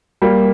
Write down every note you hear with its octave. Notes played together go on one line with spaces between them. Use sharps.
G3 A#3